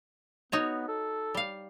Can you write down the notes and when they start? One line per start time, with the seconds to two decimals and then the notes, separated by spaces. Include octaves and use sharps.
0.52 B3 D#4 F#4 C#5
0.88 A4
1.35 G3 F5